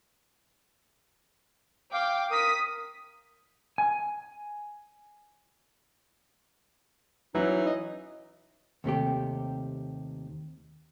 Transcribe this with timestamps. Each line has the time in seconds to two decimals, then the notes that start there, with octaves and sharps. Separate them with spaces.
1.93 F5 G5 D6
2.31 A#4 D#6 B6
3.78 G#5
7.35 E3 F#3 C#4 D#4
7.66 D#5
8.84 D#2 C3 A3 G4